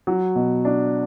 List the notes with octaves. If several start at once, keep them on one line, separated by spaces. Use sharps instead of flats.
F#3
B2
D4